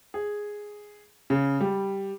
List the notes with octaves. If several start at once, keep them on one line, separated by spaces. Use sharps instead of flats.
G#4
C#3
G3